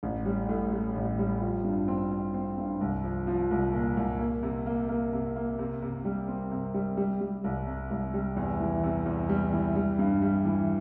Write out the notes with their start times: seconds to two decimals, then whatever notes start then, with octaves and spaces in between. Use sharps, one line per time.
0.03 A1
0.25 G3
0.49 A2
0.72 G3
0.96 A1
1.19 G3
1.41 F3
1.64 G2
1.88 C4
2.12 C4
2.34 C4
2.58 G2
2.81 C2
3.04 F3
3.27 F3
3.51 C2
3.73 A#2
3.97 C2
4.19 A#3
4.43 C3
4.66 A#3
4.89 A#3
5.13 C3
5.36 A#3
5.59 C3
5.82 C3
6.05 G3
6.28 C4
6.52 C3
6.74 G3
6.97 G3
7.21 G3
7.44 C2
7.67 C3
7.91 C2
8.14 G3
8.37 E2
8.60 E3
8.83 C3
9.06 E2
9.29 G3
9.53 E3
9.76 G3
9.99 G2
10.22 G3
10.45 E3